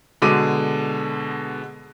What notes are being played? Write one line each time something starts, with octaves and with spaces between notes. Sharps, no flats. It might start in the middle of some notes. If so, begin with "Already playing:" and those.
B2 D3 G#3 D6 D#7